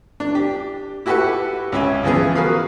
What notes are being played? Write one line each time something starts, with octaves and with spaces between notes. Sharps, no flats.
D4
G4
E4 F#4 G4 A4 B4 F#5
C#2 C#4 E5 G#5
C#3 E3 F3 B3 G#4
F#4 A#4 B4 F5 D#6